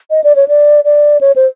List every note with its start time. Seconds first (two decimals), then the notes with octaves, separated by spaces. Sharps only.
0.10 D#5
0.24 D5
0.36 C#5
0.48 D5
0.85 D5
1.21 C#5
1.36 C5